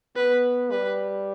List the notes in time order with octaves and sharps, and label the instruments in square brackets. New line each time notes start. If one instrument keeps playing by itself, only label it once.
[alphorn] B3 [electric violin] B4
[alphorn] G3 [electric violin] B4